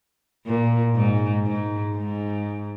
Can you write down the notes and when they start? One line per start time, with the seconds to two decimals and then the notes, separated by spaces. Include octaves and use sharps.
0.46 A#2
0.95 G#2
1.46 G#2
1.95 G#2